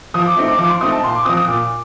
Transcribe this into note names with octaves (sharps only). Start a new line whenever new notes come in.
F3 D#6
D6
A3 C4 D#4
D6
F3 D6
C6
A3 C4 D#4 D#6
A5
A#2 C6
D6
F3 C4 D#6
D#6
A#2 D6